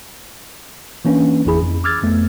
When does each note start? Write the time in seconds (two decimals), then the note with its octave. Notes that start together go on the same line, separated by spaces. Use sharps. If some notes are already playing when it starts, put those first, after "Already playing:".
1.05 E3 A#3 C#4 D4 B4
1.45 G1 E2 E3 E4 G#4 B5
1.63 F2
1.84 D6 E6 F6 G#6 A6
2.03 F2 A3 B3